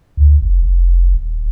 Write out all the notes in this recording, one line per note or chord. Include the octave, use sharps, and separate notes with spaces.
D2
F1
F1
D#1